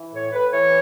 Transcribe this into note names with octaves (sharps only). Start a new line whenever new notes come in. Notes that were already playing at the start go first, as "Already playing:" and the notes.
Already playing: E3
A2 C#5
A2 B4
E3 C#5